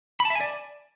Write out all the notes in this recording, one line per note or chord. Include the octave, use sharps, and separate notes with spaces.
B5
A5
E5
G#5
D5